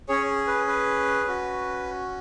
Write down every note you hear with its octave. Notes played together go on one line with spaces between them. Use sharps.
C#4 G#4 C#5
B4
B4
C#4 F#4